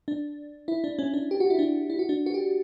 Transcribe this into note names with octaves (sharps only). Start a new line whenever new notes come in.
D4
E4
D4
C#4
D4
G4
F#4
E4
D4
E4
F#4
D4
F#4
G4